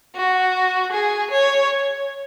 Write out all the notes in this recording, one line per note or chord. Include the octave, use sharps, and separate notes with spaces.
F#4
G#4
C#5